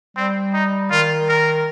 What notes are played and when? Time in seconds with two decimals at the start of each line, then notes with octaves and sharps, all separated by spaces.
0.16 G3 C4
0.54 D#4
0.91 D#3 F4
1.28 A#4